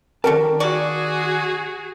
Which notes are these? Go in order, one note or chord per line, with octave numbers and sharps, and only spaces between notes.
D#3 G3 F#4 G4 A#4 A5
A#3 F#4 G#4 D5 C#6